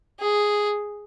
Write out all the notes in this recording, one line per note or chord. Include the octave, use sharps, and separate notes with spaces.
G#4